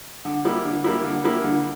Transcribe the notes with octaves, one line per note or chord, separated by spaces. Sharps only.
D3
G3 A#3 E4
D3
G3 A#3 E4
D3
G3 A#3 E4
D3